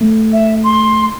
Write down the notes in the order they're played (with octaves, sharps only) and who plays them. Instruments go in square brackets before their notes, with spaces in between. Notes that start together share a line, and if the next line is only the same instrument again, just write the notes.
[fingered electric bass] A3
[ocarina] E5
C6